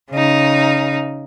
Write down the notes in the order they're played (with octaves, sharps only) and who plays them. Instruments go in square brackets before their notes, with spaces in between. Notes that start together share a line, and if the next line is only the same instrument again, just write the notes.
[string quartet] C#3 D#4